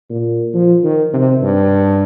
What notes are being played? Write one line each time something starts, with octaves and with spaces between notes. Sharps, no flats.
A#2
F3
D#3
C3
G2